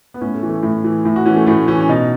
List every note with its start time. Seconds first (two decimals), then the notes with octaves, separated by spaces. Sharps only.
0.14 B3
0.21 A2 C#4
0.35 A3
0.43 E3
0.49 A3
0.63 A2
0.84 E3
1.05 A2
1.16 F#4
1.26 E3 C#4
1.36 A3
1.47 A2 A3
1.68 E3 C#4
1.81 C#4
1.89 B2 D#4